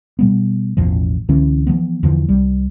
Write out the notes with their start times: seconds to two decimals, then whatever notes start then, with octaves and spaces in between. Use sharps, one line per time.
0.19 B2 G3 B3
0.77 A1 E2 B2 F3
1.29 C#2 D3 E3 C#4
1.67 E3 F3 A3 B3
2.03 E2 D3 E3 F3
2.28 C2 G3